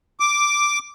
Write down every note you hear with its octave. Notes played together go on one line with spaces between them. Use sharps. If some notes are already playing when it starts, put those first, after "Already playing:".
D6